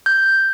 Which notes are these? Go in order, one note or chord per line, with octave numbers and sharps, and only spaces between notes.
G6